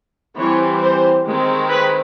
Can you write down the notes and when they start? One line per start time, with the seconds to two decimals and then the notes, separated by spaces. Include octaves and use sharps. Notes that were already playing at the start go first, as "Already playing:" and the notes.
0.38 E3 G3 C4 C#5
0.82 C5
1.26 D#3 G#3 C4
1.70 B4